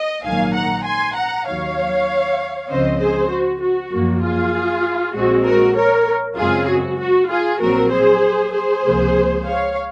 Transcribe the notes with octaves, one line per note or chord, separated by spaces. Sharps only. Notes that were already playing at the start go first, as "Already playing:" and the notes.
Already playing: D#5
A#1 G#2 D#3 F#3 A#3 F5 G#5
F#5 A#5
G#5 C6
F#5 A#5
D#2 D#3 F#3 C#5 F5
C#2 C#3 F3 C4 C5 D#5
G#4 C5
F#4
F#4
F#2 F3 A#3
F4 G#4
A#1 A#2 G#3 C4 F#4
F#4 A#4
A#4 C#5
F#2 C#3 G#3 C4 F4 G#4
F#4
F#4
F4 G#4
A#1 A#2 F#3 C4 F#4 A#4
G#4 C5
G#4 C5
C#2 C3 F3 A#3
C#5 F5